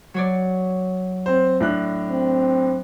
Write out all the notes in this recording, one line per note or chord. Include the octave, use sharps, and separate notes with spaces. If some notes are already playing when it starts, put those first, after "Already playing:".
F#3 C#5 D5
C4 C5
A2 D4 F#6
C4